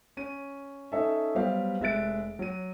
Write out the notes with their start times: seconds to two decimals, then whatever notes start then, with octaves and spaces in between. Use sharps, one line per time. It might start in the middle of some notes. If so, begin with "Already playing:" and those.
0.17 C#4 D#7
0.92 C#4 D#4 A4 E5
1.35 F#3 G3 B3 G4 C5 F5
1.80 F1 G#3 E5 F#6 A6 D7
2.39 F#3 D#7